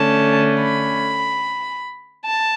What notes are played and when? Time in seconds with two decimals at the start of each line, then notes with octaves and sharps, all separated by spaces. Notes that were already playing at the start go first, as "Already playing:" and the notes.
Already playing: D3 A3 C#4 A5
0.61 B5
2.25 A5